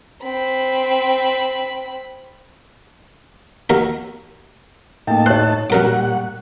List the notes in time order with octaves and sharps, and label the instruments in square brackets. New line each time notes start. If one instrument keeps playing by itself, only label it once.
[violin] C4 B5
[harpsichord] D#2 F#4 A#4
[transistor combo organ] A2 D#4 A5 [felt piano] A#3 G5
[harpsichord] C5 [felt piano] C#5 F#6
[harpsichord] F#2 A#4 D6 [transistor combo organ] A#2 G3 F#5